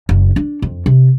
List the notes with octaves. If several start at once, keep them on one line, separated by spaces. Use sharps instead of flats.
F#1
D4
F2
C3